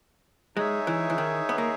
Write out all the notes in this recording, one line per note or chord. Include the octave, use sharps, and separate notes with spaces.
G#3 D#4 G#4 C#5 E5
E3
E3
D#3
B3
A#3